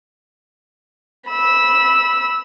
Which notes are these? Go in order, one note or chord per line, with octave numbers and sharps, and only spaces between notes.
B5 E6